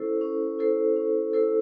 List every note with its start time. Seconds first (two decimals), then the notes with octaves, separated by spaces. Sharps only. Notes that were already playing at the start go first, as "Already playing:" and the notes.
Already playing: C#4 E4 A4 C5
0.21 C#4
0.59 E4 A4 C5
0.96 C#4
1.33 E4 A4 C5